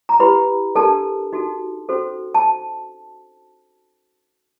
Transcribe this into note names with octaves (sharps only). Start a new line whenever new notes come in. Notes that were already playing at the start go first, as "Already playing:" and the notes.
A#5
E4 G4 B4 B5
D4 G4 A4 A#4 A5
D#4 F#4 A4
C#4 F#4 A4 C5
A5